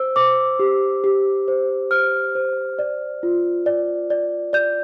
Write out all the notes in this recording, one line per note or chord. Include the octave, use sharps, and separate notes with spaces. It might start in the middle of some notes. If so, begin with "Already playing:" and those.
Already playing: C5 E6
C5 D6
G4
G4
C5
C5 F6
C5
D5
F4
D5
D5
D5 G6